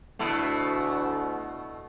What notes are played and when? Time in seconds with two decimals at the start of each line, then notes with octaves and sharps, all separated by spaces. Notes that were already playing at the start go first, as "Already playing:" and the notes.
0.19 D2 B2 A3 E4